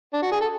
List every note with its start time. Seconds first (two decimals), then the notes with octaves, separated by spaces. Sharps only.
0.14 D4
0.23 F#4
0.32 G#4
0.40 A4